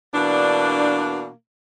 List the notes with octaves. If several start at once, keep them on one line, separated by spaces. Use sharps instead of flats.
B2 E3 A#3 D4